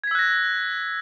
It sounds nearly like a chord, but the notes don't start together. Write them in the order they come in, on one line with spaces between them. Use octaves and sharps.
G#6 B6 E6 F#6 A#6